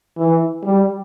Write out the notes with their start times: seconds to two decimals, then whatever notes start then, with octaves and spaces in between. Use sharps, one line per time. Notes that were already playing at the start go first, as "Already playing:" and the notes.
0.18 E3
0.64 G3